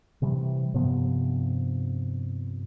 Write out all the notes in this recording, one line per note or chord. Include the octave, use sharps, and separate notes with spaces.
C3 E3 G3
G2 C3 F3 B3